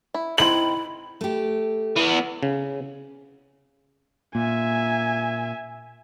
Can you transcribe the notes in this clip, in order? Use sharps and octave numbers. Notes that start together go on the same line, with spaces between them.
E4
C4 D#4 E4 F#7
A3 G4
E3 B3
C#3
A#2 E5 G#5